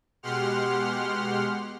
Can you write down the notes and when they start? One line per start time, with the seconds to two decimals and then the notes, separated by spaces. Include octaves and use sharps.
0.23 B2 G#3 G4 F#5 C6 F6